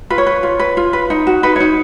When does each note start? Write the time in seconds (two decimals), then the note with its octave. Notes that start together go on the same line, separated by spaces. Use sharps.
0.10 F4 B4
0.18 C#5
0.27 B4
0.43 F4
0.59 B4
0.77 F4
0.93 B4
1.10 D#4
1.27 F#4
1.43 D#4 B4
1.56 D#4 C#5